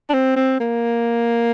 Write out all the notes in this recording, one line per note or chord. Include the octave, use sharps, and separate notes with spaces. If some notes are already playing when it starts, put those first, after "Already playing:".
D4
C4
C4
A#3